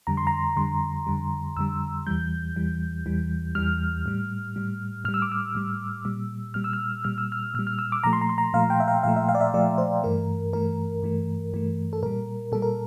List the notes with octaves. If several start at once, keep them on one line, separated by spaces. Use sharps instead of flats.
F2 D3 G3 A#5
C6
A#5
F2 D3 G3 C6
F2 D3 G3
F2 D3 G3 E6
E2 E3 G3 G6
E2 E3 G3
E2 E3 G3
E2 E3 G3 F6
A2 G3
A2 G3
A2 G3 F6
E6
D6
E6
A2 G3
A#2 G3
A#2 G3 F6
E6
F6
A#2 G3 F6
E6
F6
A#2 G3 F6
F6
E6
D6
A#2 F3 A3 A#5
C6
A#5
C6
A#5
A#2 F3 A3 F5
G5
E5
F5
A#2 F3 A3 F5
E5
F5
D5
E5
A#2 F3 A3 D5
C5
G2 E3 A3 A#4
G2 E3 A3 A#4
G2 E3 A3
G2 E3 A3
A4
A#2 G3 A#4
A#2 G3 A4
A#4